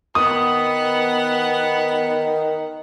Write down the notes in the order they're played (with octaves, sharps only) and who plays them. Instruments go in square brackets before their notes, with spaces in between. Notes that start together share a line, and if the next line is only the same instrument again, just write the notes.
[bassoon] D#3 [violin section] B3 F#5 [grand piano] D#6